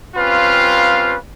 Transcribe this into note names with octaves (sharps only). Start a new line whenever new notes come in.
G3 C4 C#4 F4 B4 F5